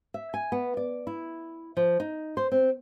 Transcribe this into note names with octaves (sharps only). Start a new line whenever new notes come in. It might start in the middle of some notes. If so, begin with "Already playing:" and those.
E5
G#5
B3
D5
E4
F3
D#4
C5
C4